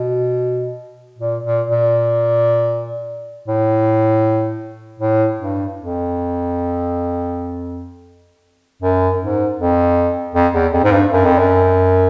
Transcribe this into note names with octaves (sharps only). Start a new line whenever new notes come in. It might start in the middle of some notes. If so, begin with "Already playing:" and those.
Already playing: B2
A#2
A#2
A#2
A2
A2
G2
F2
F#2
G#2
F2
F2
E2
F2
G#2
G2
F#2
F2
F#2